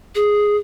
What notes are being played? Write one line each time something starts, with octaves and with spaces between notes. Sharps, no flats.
G#4